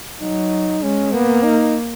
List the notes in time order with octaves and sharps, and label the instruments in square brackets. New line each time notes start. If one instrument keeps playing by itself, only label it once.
[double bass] F#3 [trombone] D#4
[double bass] G#3 [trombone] C#4
[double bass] A#3 [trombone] B3
[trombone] D#4